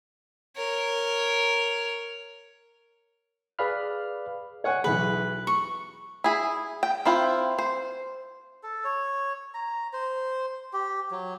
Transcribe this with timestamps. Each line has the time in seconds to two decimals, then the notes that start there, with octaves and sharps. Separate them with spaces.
0.57 A#4 C#5
3.59 G#4 B4 D5 F5 B5 F6
4.64 C#5 F#5 G#5
4.84 B1 E2 G#4 B4
5.47 C#6
6.24 E4 G#4
6.83 G5
7.05 C4 E4 F4 C5
7.59 C5
8.63 A4
8.84 C#5
9.54 A#5
9.93 C5
10.73 G4
11.11 F#3